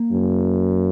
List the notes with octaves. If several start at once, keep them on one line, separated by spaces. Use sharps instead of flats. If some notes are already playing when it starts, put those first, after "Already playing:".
Already playing: A#3
F#2